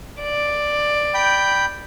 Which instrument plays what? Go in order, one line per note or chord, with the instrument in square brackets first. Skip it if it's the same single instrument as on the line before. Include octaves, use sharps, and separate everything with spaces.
[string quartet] D5
[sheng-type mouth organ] G5 B5 G6